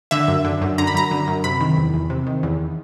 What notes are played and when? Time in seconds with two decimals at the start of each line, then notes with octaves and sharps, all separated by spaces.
0.11 D3 E5
0.28 F#2
0.45 D3
0.61 F#2
0.78 D3 A#5
0.87 B5
0.94 F#2 A#5
1.11 D3
1.28 F#2
1.44 C3 B5
1.61 D#3
1.77 E2
1.94 E2
2.10 C3
2.27 D#3
2.43 E2